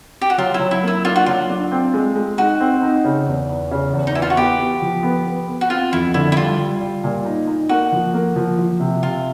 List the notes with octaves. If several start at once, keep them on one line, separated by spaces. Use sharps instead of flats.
G4
F#4
F#3 F4
E4
F#3
E4
A#3 E4
D4 F4
F#4
F#3 F4
D4
C4
G#3
G#3
D#4 F#4
C4
D#4
C#3
E2
E2
C#3
E2
D#4
E3 E4
F4
F#4
B3 G4
B3
F3
B3
B3
B3
F#4
C4 F4
F2 E4
D3 E4
E4
G3 F4
G3
G3
A#2
D#4
D#4
A#3 F#4
F3
A#3
F3
F3
C3
C3 F4